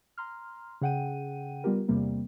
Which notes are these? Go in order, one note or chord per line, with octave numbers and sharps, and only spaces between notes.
A#5 C6 F6
C#3 G#4 F#5 G5 D#7
G3 B3 F4 G4 A#4
E2 C3 G3 A#3